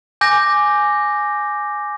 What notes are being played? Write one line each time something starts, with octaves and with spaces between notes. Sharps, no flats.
G#5 D6 G6 A#6